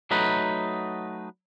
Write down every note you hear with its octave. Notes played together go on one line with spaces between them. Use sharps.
F#3 A3 D#4 B4